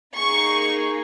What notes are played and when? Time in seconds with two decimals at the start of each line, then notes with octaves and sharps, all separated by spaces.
0.17 A#3 D#4 G#4 C#6